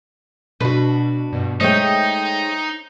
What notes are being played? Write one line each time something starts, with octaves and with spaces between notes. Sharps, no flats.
B2 D4 F#4 B4
G2 B2
G#3 A3 D#4 C5 C#5 D#5 E5 G5